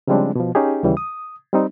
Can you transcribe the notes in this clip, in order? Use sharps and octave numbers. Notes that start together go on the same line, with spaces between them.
C#3 F3 G3 G#3 C4 D4
B2 F3
C#4 D#4 G4 G#4
D#2 C#3 E3 G3
D#6
G3 C4 D#4